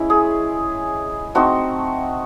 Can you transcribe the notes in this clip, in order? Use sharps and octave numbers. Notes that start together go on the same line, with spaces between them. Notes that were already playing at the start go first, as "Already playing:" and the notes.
Already playing: G#3 C#4 E4
G#4
A3 C4 D#4 F#4